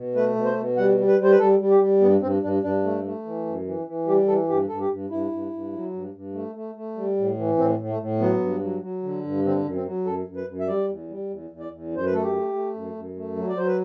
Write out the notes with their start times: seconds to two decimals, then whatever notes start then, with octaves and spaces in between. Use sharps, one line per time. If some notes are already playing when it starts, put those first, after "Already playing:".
Already playing: B2
0.15 A3 B4
0.36 B2
0.46 C5
0.56 B2
0.77 G3 F#5
0.97 G3
1.08 B4
1.19 G3
1.24 C5
1.31 B4
1.39 G3 A4
1.59 G3
1.70 G4
1.80 G3
2.01 G2 B3
2.21 G2 C4
2.42 G2 D4
2.62 G2 D4
2.84 A3
3.04 A3
3.25 E3
3.46 F#2
3.66 E3
3.87 E3
4.07 G3 G4
4.28 E3 A4
4.49 G2 G4
4.68 G2 A4
4.80 G4
4.90 G2
5.10 G2 E4
5.31 G2
5.52 G2
5.73 F#3
5.93 G2
6.14 G2
6.34 A3
6.55 A3
6.75 A3
6.96 G3
7.17 A2
7.37 E3
7.58 A2 C4
7.79 A2
7.89 A3
8.00 A2
8.20 F#3 B3
8.40 G2
8.61 F#3
8.82 F#3
9.03 D3
9.23 G2
9.44 D3 C4
9.64 F#2
9.75 C4
9.85 F#3
10.05 F#2 A4
10.27 F#2
10.37 B4
10.47 F#2
10.60 E5
10.67 G3 D5
10.89 E2
11.09 G3
11.30 E2
11.50 E2
11.60 D5
11.71 E2
11.92 F#2 C5
12.06 B4
12.12 A3 A4
12.23 G4
12.33 A3
12.54 A3
12.74 F#2
12.94 F#2
13.16 A3
13.36 F#3
13.48 D5
13.56 F#3 C5
13.67 B4